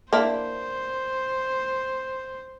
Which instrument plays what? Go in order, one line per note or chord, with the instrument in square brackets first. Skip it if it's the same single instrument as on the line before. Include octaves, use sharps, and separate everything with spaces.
[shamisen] A#3 D4 E4 [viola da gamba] C5